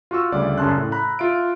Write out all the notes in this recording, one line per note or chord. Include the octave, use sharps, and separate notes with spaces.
F4 F#4 C#6 E6
D2 C#3 G3 D5
F#2 C#3 C#4 A5 C6 F#6
A2
A#5 B5 F#6
F4 E5 D7